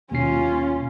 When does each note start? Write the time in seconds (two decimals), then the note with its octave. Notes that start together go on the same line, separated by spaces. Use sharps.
0.11 D#2 B2 C#4 F4 C7